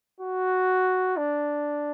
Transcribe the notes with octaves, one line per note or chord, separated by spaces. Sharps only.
F#4
D4